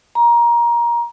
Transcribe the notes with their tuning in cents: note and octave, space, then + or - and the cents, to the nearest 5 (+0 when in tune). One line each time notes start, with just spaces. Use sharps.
A#5 +20